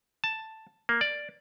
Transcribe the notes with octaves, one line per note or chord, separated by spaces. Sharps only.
A5
A#3
D5